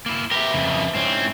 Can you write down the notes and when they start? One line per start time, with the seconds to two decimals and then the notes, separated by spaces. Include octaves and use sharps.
0.06 A#3 E4
0.31 G4 A#4 B4 E5
0.54 F2 C#3
0.95 G#2 C4 C#4 E4